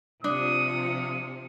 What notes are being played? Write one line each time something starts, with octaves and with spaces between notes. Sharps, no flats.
C3 F3 D4 D#6